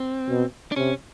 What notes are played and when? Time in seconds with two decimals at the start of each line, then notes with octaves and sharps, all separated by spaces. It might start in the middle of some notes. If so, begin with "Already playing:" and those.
Already playing: C4
0.29 B2
0.72 D4
0.76 C3 C#4